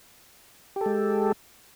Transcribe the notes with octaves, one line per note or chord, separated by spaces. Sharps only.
G#3 G4 A4